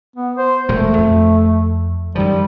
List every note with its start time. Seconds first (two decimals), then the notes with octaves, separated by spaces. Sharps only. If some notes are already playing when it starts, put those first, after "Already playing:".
0.16 B3
0.38 C5
0.69 E1 A#2 G#3 A3
0.98 F2
2.15 F#2 D#3 F3 G3